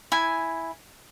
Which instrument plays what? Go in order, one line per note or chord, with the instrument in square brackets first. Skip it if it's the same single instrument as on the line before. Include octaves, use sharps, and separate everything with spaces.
[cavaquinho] E4 G#5